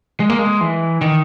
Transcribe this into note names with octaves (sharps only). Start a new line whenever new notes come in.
G#3
A#3
G#3
E3
D#3